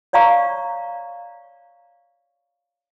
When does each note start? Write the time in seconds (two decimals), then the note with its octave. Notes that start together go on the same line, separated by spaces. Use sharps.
0.13 C#5 D5 F5 A#5 C#6